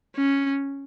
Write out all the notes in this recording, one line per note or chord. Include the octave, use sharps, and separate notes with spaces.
C#4